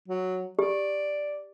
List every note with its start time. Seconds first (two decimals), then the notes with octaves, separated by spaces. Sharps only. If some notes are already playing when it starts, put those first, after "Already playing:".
0.08 F#3
0.59 G4 D5